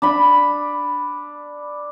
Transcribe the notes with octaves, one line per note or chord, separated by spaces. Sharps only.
D4 B5